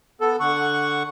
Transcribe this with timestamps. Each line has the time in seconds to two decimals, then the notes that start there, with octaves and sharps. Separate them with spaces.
0.21 B3 A4
0.40 D3 F#5 C#6